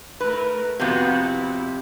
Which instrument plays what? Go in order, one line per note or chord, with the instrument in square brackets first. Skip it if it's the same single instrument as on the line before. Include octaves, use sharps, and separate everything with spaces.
[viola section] A3 E4 A#4 [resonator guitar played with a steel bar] B4
[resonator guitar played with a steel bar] F2 C3 [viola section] B3 F4 F#4
[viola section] E4